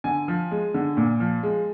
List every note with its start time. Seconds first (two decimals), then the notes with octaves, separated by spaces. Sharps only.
0.04 D3 G#5
0.28 F3
0.51 G#3
0.74 D3
0.97 A#2
1.20 F3
1.43 G#3